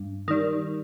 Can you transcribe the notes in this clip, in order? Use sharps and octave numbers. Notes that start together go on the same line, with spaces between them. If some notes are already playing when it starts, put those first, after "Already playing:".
Already playing: G2
D#3 G3